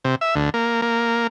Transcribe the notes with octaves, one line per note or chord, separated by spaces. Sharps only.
C3
E5
D2
A#3
A#3